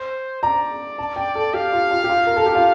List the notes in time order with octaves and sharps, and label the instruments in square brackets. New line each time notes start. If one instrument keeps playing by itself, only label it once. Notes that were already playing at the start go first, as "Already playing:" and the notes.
Already playing: [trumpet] C5
[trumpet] D5 [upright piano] A#5
[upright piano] A5
G5
A4
[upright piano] G4 [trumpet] F5
[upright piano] F4
F4
G4
F4
A#4
A4
G4
F4